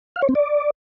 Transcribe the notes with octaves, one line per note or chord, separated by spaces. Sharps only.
F5
C#5
C4
D5